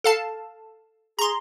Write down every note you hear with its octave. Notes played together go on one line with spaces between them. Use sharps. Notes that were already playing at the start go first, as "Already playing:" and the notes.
A4 F5 A5
G#4 A#5 C6